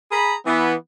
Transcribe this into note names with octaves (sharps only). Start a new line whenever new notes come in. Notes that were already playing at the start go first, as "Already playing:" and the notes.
G#4 A#5 B5
E3 B3